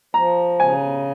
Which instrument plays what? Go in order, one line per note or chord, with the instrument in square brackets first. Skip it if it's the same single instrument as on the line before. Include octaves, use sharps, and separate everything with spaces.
[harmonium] F3 [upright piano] A#5
[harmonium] C#3 [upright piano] G#5